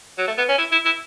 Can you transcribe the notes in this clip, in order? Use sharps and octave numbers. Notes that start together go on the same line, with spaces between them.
F#3
A3
B3
C#4
E4
E4
E4